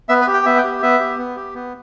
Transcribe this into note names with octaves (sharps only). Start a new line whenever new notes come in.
B3 E5
B4
G4
G5
B3 E5
G5
G4
B3 E5
G4
B3
G4
B3